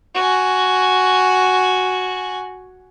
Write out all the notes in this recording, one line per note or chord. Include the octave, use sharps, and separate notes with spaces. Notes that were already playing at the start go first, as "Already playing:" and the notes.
F#4 G#5